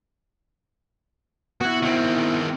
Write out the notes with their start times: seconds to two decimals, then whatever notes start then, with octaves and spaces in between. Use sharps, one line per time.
1.61 B3 E4 F#4
1.82 D#3 C4